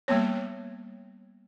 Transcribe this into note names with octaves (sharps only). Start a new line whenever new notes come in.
G3 A#3 B3 C#5